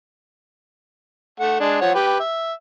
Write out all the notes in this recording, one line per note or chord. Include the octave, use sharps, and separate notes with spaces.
A3 F#5
G#3 D4
F3 C#5 F#5
G4 B4
E5